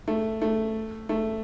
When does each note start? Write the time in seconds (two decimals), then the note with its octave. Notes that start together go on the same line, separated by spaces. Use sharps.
0.08 A3
0.42 A3
1.09 A3